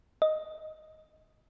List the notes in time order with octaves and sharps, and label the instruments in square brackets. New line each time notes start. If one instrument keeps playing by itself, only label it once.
[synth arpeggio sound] D#5